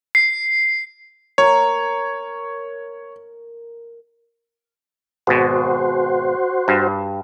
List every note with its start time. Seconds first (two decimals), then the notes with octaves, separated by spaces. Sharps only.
0.15 C7
1.38 A#4 C#5
5.27 G#1 B2 F#4 C5
6.68 G2